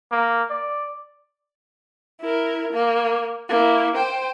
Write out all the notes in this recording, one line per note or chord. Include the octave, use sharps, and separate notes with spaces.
A#3
D5
E4 A#4
A#3
A#3 E4
C5 G5